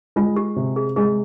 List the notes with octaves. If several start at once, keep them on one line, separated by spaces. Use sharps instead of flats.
G#3 F4
G4
C3
G#4
G#3 G#4